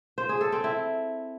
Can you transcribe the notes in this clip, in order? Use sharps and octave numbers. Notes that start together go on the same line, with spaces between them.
C5
G#4
A4
C4
E4